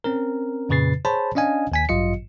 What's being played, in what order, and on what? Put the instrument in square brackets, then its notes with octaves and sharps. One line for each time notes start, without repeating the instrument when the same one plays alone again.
[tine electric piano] C4 C#4 A#4
F2 A#2 C#3 B4 A6 C7
G#4 C5 C#5 G#5 A5 B5
C#4 D4 D#5 F5 G#5
D#2 G#5 B6
A1 G2 F#3 F4 D#5 C#7